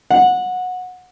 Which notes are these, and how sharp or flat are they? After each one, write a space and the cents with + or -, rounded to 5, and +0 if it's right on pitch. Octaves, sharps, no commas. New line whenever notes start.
F#5 -20